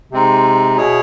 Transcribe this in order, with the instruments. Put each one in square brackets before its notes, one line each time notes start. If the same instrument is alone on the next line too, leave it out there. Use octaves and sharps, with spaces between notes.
[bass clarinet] C3 [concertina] G#3 C4 D#4
[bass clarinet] B2 [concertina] E4 G#4 C#5